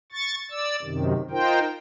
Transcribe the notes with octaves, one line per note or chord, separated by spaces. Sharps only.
C#6 A6
D5 E6
F#2 C3 D#3
D#4 F4 A#4 C5 G5